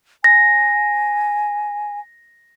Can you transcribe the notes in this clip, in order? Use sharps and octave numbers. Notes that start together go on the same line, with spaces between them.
G#5 A#6